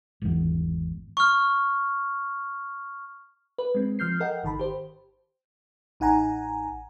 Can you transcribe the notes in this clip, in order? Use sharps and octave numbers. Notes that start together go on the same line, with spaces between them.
G#1 E2
C#6 F6
B4
G#3 C4
F3 F6 G6 C7
A4 A#4 D#5 F#5 G5
G#1 D#3 A5 B5
G4 C5
A1 D#4 F#5 G#5 A#5